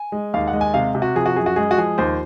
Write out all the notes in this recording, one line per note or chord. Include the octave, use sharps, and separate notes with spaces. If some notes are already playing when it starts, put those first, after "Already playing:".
Already playing: G#5
G#3
D#2 F5
F#5
G#3
G#5
C3 F5
C3
F#4
F3 G#4
F#4
F#2 G#4
F#4
G#3 G#4
F#4
F3 G#4
D#2 C5